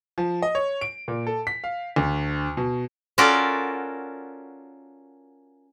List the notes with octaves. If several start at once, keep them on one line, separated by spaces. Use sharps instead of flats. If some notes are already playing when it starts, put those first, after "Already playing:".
F3
D#5
C#5
D7
A#2
A4
B6
F5
D2
B2
C#4 F4 F#4 A4 A#4 D5